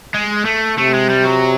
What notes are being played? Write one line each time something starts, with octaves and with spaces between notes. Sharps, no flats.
G#3
A3
C3 A3
G#3
G3
F#3